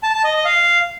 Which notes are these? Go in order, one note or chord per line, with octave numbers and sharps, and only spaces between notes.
A5
A5
D#5
D#5
F5